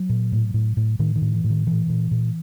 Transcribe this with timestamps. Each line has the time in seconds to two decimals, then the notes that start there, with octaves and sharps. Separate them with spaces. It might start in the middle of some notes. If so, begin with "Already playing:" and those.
Already playing: F#3
0.09 A#2
0.32 A2
0.54 A2
0.77 A2
0.99 A2 D#3
1.16 D#3
1.22 A2
1.33 E3
1.44 A2
1.50 D#3
1.67 A#2 E3
1.89 A#2
2.11 A#2